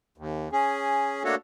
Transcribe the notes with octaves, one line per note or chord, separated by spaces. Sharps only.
D#2
C#4 G#4
A3 A#3 D4 F#4 A4 C#5